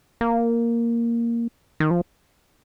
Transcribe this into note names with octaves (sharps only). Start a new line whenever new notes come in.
A#3
D#3
F3